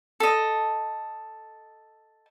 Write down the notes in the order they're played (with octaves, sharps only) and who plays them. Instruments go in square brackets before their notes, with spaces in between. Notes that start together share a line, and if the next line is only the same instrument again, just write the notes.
[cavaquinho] A4 D#5